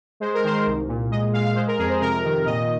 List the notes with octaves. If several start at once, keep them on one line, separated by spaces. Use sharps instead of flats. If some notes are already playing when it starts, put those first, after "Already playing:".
G#3 C5
A#4
D#3 C5
C2
A#2
G#3 D#5
G#3 F5
F5
G#3 C5
A#4
F2 G#4
C5
C3 A#4
D#3
A#2 D#5